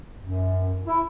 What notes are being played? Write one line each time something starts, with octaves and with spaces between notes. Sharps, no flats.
F#2
E4